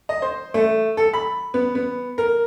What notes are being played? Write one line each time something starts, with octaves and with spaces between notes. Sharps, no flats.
D#5
C5
A3
A4
B5
B3
B3
A#4